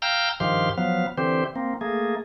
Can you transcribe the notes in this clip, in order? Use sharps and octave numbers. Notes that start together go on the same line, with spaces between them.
F5 G5 A#5 E6 F6 G6
G2 D#3 F3 G4 F5 C6
F3 F#3 B3 F5
D3 E3 C4 G4 C5
A#3 C4
A3 A#3 G#4